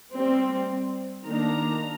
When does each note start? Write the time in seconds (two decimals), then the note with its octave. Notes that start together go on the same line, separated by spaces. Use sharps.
0.17 G3 C4
1.27 D#3 A#3 D4 A#5